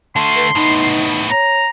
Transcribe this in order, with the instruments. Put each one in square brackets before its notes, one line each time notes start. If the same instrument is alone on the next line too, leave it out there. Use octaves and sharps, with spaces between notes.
[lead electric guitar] D3 A3 [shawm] C6
[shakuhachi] B4
[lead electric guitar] A2 B3 [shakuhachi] D#4
[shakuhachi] C#5 [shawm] A#5